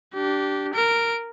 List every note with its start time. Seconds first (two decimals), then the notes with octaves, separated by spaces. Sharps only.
0.14 D4 G4
0.74 A#4 D7